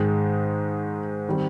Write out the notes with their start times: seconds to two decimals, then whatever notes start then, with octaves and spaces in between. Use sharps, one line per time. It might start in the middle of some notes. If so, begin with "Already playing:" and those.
Already playing: G#2 D#3 G#3
1.28 D#3 G3 C4